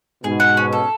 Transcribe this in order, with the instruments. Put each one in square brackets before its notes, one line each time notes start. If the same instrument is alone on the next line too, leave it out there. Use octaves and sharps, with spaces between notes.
[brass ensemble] G#2 B2 [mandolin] G#4
[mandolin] F#5
C#4
A4